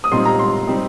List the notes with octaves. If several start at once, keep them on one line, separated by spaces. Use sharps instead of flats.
D#6
A#2 G3 C4 D#4 C6
A#5
C6
G3 C4 D#4